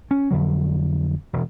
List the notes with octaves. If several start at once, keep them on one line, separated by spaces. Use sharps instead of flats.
C#4
F2 D3 F#3
E1